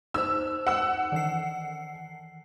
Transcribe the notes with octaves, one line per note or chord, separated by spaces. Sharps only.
D#4 C5 E6
F#5 E6
D#3 E3 C7